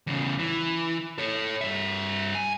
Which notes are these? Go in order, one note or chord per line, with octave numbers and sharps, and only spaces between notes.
E2 C#3
E3
A4 C#5
G2 E5
G#5